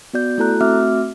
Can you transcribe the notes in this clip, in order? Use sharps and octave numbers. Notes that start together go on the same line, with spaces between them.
B3 F#4 D5 G6
A3 E4 F#4 A4 A#5 F#6
A3 C4 F#4 E5 D6 F6